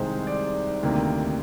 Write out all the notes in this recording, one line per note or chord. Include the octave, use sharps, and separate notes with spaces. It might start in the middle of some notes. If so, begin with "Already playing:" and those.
Already playing: C2 C3 D#3 G#3 C5
D5
D2 C3 D#3 A#3